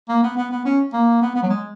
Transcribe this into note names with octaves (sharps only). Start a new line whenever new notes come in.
A#3
B3
B3
B3
C#4
A#3
B3
B3
F#3
G#3